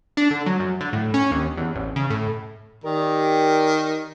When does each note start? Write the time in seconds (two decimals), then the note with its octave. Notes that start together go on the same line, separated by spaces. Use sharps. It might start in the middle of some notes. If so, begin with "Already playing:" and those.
0.17 D4
0.31 D3
0.46 F#3
0.60 F#2
0.81 D3
0.93 A2
1.14 C#4
1.31 D#2
1.57 E2
1.75 A1
1.96 C#3
2.10 A2
2.84 D#3 G4 A#4 D5